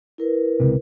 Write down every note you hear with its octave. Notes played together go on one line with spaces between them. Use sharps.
E4 A#4 B4
C#2 F#2 C3